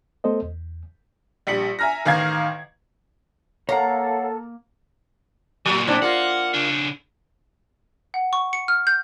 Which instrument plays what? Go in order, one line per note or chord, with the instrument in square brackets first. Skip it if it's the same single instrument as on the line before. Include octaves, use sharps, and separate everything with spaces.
[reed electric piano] A3 B3 A4 C5 D#5
E2
[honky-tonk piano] A#1 G3 B6 C#7 F#7
E5 G#5 A#5 F6 A#6
A1 D#3 F5 A#5 G#6
[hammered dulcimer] A#3 [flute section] A4 [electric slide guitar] C#5 F5 F#5 [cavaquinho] A#5
[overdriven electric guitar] F#2 A#2 [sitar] F#3
[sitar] C4 D4 E4
[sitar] A#3 F4 [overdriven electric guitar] F#5
[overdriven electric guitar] C#3 D4
[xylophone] F#5
C#6
C#7
F6
G6